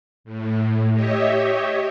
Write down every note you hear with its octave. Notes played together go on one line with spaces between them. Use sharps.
A2
G4 C#5 D#5 E5